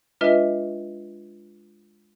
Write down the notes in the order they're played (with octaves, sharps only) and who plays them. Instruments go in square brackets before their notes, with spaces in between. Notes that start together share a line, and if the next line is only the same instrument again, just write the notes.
[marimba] G#3 D4 F4 B4 D#5 E5